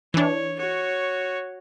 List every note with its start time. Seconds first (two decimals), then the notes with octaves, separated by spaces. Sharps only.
0.14 E3 D4 C#5
0.59 F#4 C#5